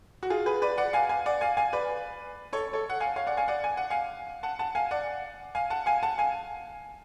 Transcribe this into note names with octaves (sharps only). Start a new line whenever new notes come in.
F#4
F4 G#4
G#4 B4
B4 D5
D5 F#5
F5 G#5
F5 G#5
D5 F#5
F5 G#5
F5 G#5
B4 D5
A4 C#5
A4 C#5
F#5
F5 G#5
C#5 F5
D5 F#5
F5 G#5
D5 F#5
G#5
F#5
F5 G#5
F#5 A5
F#5 A5
F5 G#5
D5 F#5
F5 G#5
F#5 A5
F5 G#5
F#5 A5
F5 G#5